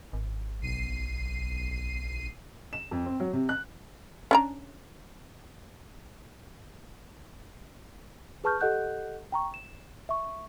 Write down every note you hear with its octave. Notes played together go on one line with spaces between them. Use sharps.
G#1
B1 C7 D#7
E7
F2
C4
F#3
C3
F#6
C#4 D4 A#5
G#4 B4 A5 C#6 F6 G6
G4 A4 D#5 F#5 F#6 G6
G5 A#5 C#6
E7
E5 C#6